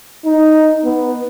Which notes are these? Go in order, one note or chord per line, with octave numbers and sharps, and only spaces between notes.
D#4
B3